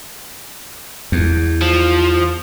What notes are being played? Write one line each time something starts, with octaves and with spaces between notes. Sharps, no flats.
E2
F3